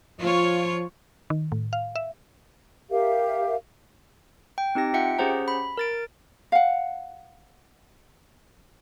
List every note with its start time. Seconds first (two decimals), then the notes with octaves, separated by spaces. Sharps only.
0.21 F3 F4 C#5
1.30 D#3
1.52 A2
1.73 F5
1.96 E5
2.90 G4 A#4 E5 F5
4.58 G5
4.75 C4 D#4 G4 A#6
4.94 F4 E5 F#5 G5 C#7
5.18 C#4 G4 G#4 C5 F#5 A#5
5.48 B5
5.78 A#4 A6 D7
6.52 F5 F#5